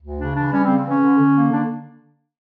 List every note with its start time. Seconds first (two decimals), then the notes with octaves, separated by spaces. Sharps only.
0.01 D2
0.18 C#3 D4
0.35 E3 D4
0.52 G3 C#4
0.64 C#3 C4
0.77 C4
0.85 E3 C#4
1.02 D3
1.19 D3
1.35 A#3
1.52 D3 D4